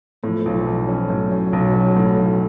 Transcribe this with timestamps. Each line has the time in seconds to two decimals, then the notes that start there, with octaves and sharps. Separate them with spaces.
0.24 A2 F3
0.46 B1
0.67 B1
0.88 C#4
1.10 A2 F#3
1.32 C#4
1.53 B1
1.74 C#4
1.96 A2
2.18 B1